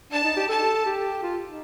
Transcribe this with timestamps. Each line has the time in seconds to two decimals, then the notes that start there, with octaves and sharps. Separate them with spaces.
0.12 D4 A5
0.24 D#4
0.36 G4
0.49 A4 A5
0.86 G4
1.23 F4
1.47 D#4